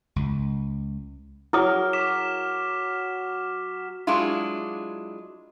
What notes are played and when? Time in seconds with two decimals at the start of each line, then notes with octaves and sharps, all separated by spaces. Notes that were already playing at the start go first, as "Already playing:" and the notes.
0.16 C#2
1.53 F#3 E4 G#4 A#4 D#6 F6
1.93 D6 B6 E7
4.07 F#3 G#3 D4 E4 F4